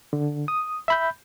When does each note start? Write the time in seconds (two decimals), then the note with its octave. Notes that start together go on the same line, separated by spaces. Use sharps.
0.13 D3
0.48 D#6
0.88 E5 B5 G6